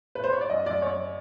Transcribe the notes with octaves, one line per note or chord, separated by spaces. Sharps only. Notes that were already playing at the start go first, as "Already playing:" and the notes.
B4
C5
C#5
D5
F#2 D#5
F#2 D5
F#2 C#5